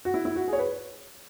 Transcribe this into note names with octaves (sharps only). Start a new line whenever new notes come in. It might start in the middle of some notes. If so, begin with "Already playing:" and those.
F#4
E4
E4
F#4
G#4
C#5
B4